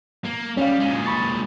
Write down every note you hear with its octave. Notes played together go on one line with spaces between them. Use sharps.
A#3
G3 C#4 F5
A#2 G#3
B5 C#6 A6